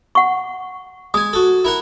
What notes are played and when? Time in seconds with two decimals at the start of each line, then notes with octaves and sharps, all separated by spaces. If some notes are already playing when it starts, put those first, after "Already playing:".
0.15 F#5 C#6
1.14 G#3 G#5 D#6
1.33 F#4 A4
1.65 E4 A#4 F#5